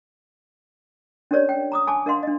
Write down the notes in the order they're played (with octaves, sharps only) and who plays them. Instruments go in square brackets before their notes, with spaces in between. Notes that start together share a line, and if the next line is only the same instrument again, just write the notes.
[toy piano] C#4 D4 G4 A#4 C#5 D5
G5
A#5 D6 D#6
G#5 A5 B5 D6
D4 A#4 D#5 F5 F#5 C6
D4 D#5